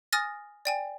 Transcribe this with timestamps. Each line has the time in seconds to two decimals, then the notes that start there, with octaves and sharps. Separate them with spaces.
0.13 G#5 D#6 F6 A6 A#6
0.65 D5 G5 G#5